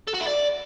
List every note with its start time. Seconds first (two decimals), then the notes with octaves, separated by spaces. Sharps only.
0.08 A4
0.14 F#4
0.21 E4
0.27 D5